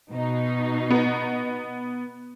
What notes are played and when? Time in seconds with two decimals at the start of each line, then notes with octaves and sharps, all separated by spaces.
0.11 B2 D#4
0.90 B3